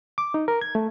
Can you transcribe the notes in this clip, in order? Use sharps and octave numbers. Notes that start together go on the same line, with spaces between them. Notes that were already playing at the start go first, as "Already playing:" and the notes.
D6
D#4
A#4
G#6
A3